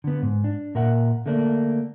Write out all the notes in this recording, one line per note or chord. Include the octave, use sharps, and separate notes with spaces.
D3 B3
G#2
D4
A#2 A#4 E5 F#5
D3 A3 A#3 D4